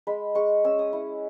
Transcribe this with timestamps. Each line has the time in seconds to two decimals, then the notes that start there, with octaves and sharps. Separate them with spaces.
0.07 G#3 B5
0.35 G#3 C#6
0.64 C#4 E6
0.79 D#6
0.93 E4